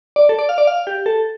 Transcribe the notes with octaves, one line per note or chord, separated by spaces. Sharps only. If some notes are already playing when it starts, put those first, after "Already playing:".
D5
A4
D5
F5
D5
F5
G4
A4